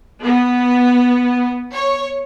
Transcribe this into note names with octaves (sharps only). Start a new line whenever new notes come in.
B3
C#5